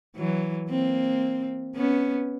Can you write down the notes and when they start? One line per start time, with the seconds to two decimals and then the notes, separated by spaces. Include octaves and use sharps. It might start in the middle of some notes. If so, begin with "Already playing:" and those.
0.16 E3 F#3
0.70 A#3 C4
1.75 B3 C#4